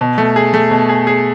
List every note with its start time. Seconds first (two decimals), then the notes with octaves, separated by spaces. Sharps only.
0.01 B2
0.18 A3
0.36 G#4
0.54 A3
0.71 B2
0.89 G#4
1.07 G#4